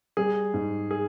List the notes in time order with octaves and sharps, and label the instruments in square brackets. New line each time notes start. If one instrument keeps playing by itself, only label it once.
[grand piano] G3 G#4
G#2
G#4